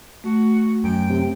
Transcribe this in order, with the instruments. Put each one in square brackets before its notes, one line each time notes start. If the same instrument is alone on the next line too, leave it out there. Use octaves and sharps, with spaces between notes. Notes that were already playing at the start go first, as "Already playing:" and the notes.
[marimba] A3 [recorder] F#4
[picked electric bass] F#2 [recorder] G5
[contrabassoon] C3